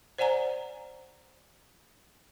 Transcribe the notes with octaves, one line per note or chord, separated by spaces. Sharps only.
C5 D5 F#5 G#5 A#5